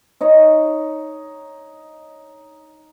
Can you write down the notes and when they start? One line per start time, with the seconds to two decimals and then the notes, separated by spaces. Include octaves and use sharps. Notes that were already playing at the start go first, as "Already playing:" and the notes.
0.21 D#4 C#5 D#5